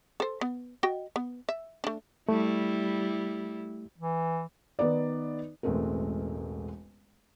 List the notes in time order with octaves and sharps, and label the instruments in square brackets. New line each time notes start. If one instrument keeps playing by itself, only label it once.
[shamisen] A4 C5
B3
F#4 D#5 G5
B3
E5
A3 D4
[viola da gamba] G3 E4 [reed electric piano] A3
[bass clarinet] E3
[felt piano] D#3 B3 D#4 D5
E1 A1 G#3 A3 C4 A#4